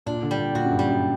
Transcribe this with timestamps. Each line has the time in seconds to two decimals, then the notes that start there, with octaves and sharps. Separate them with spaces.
0.06 A#2 D4
0.22 D3
0.31 G3
0.38 A#2
0.55 A#2 F#4
0.65 F#2
0.71 G2
0.79 G3
0.87 F#2